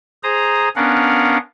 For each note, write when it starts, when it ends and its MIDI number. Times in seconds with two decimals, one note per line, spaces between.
0.23 0.69 68
0.23 0.69 72
0.23 0.69 82
0.23 0.69 87
0.76 1.38 59
0.76 1.38 61
0.76 1.38 62
0.76 1.38 70
0.76 1.38 77
0.76 1.38 78